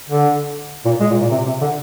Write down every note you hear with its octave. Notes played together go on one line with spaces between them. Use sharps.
D3
A#2
G#3
A#2
A#2
C3
C3
D3